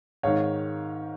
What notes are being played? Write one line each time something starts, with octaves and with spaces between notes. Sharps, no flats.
G#2 D#3 C#5 F5